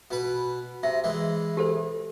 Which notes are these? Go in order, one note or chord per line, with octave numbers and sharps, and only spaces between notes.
B2 B4
C3 E5
E3 G#3
G4 A4 C5